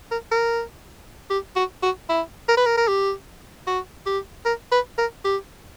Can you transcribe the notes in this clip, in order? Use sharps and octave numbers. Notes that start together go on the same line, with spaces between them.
A#4
A#4
G4
F#4
F#4
E4
A#4
B4
A#4
A#4
G4
F#4
G4
A#4
B4
A#4
G4